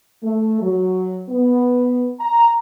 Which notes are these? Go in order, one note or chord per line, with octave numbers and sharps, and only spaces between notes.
A3
F#3
B3
A#5